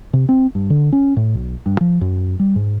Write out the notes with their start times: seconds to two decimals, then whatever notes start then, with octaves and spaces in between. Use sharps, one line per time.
0.13 C3
0.29 C4
0.55 G2
0.70 D3
0.92 C#4
1.17 A2
1.35 B1
1.66 G2
1.81 F3
2.01 F#2
2.39 G3
2.56 G#2